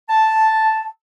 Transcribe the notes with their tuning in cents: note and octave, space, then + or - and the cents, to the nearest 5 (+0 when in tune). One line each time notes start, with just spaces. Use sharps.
A5 +0